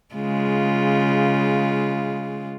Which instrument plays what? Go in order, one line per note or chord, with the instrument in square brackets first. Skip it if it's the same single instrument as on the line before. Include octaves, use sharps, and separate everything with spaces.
[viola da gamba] C#3 G#3 F4